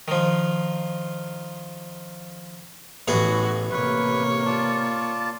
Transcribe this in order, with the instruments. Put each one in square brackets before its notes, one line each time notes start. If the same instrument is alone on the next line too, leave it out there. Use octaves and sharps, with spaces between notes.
[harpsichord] D#3 F3
[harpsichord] A1 B3 G#4 [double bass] A2 E3 [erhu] F#4
[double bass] C3 A#3 [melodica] B4 [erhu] C#5
[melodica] F4 D5 A5